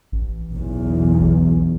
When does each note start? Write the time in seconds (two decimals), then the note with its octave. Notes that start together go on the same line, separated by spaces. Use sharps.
0.12 A1
0.52 B1 E2